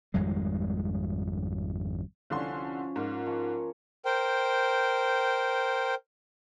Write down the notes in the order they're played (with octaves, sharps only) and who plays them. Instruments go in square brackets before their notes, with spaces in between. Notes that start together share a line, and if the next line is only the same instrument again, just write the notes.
[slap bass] G#1 F2 G3 G#3
[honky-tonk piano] C2 D3 C6 [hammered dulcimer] F3 C#4
[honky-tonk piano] G#2 [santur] A#3 F4 A#4
[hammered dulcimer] F3 [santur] C#5
[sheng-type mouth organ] A#4 C5 G5